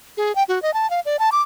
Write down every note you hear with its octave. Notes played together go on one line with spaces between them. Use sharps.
G#4
G5
F#4
D#5
A5
F5
D5
A5
D6